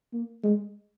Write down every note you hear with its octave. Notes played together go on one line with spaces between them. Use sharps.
A#3
G#3